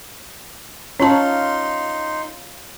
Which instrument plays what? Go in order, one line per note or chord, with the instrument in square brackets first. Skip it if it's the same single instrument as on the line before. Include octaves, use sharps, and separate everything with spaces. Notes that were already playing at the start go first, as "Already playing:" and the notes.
[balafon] C#4 A5 [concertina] D#4 C6 [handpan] F4 C#5